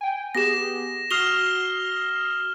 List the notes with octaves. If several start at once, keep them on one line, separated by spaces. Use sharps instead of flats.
G5 G#5
B3 G4 G#4 A#6 E7
F#4 D#6 F6 C7 F7 G7